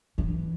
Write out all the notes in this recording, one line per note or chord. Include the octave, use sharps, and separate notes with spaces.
E3